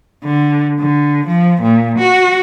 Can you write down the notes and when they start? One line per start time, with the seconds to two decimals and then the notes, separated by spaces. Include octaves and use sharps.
0.24 D3
0.80 D3
1.26 F3
1.62 A#2
1.99 F#4